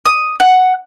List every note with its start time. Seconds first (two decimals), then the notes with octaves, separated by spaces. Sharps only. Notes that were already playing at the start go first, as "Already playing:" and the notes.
0.06 D#6
0.40 F#5